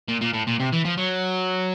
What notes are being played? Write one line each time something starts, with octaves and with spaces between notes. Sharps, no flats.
A#2
A#2
A2
A#2
C3
E3
F3
F#3